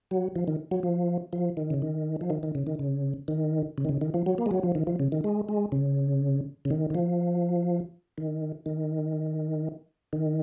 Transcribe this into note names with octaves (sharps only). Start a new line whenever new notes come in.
F#3
F3
D#3
F#3
F3
F3
D#3
C#3
D#3
F3
D#3
D#3
C#3
D#3
C#3
D#3
C#3
D#3
C#3
D#3
F3
F#3
A#3
G#3
F#3
F3
D#3
F3
C#3
D#3
G#3
G#3
C#3
C#3
D#3
D#3
F3
D#3
D#3
D#3